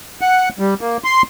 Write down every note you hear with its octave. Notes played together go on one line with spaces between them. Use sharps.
F#5
G3
A#3
C6